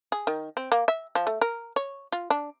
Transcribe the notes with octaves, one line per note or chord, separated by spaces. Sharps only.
G#4
D#3
C4
A#3
E5
F3
A3
A#4
C#5
F4
D4